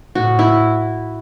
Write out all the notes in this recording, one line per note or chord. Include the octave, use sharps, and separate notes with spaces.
A2 F#4
E4